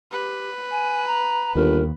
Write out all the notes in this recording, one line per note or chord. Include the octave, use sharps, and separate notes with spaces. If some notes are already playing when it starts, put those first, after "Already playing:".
G4 B4
G#5
A#5
G1 D#2 A#4